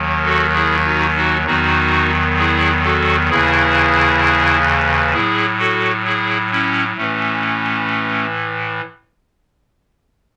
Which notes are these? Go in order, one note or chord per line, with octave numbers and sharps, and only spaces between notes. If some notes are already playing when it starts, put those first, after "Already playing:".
Already playing: D#2 D#3 F#3
F#4 A4
E4 G#4
D#4 F#4
D#4 F#4
E2 D#3 F#3 D#4 F#4
E4 G#4
F#4 A4
D#2 C#3 E3 E4 G#4
A2 F#3 E4 G#4
F#4 A4
E4 G#4
C#4 E4
A2 E3 A3 C#4